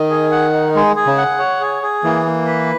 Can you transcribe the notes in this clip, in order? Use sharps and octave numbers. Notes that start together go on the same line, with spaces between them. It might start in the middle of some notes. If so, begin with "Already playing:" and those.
Already playing: D#3 D#5
G#4
F#5
D#4
G#3 G#4
G#4
C#3
F#5
C#5
G#4
G#4
E3 A#3
A#3
B4